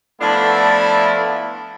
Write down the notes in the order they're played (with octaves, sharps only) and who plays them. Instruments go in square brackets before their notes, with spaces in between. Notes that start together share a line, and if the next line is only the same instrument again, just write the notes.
[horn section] F3 A3 B3 D4 E4